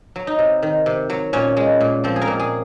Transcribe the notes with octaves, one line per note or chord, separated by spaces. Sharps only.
F#3
D#4
C3
D#3
C3
F#3
A#2 C#4
G#3
A#2
F3 C4
G#4
A#4
A#2
G#4